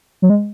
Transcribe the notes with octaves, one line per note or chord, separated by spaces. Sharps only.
F#3
G#3